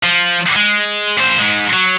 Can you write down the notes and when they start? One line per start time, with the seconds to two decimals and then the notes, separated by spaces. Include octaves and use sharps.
0.03 F3
0.56 G#3
1.18 A#2 C5
1.39 G#2 G#3
1.73 F#3